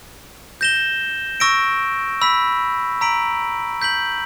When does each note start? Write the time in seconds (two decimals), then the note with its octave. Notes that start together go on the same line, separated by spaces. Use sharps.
0.61 G6 A#6 E7 G7
1.40 C#6 E6 A#6 D7
2.21 B5 E6 B6
3.01 A#5 E6 B6 D7 F#7
3.82 G6 B6 F#7